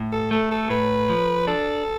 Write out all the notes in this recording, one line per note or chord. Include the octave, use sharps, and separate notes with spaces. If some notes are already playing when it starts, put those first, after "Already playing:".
Already playing: A2
A4
A3 A4
A4
A2 B4
F3
D4 A4